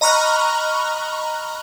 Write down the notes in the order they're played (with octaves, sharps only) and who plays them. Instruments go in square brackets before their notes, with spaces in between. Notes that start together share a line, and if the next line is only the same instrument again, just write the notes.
[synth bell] D#5 A#5 B5 C#6 F6 F#6